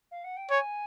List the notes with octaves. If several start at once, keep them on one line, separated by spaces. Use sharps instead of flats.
F5
F#5
G5
C#5 G#5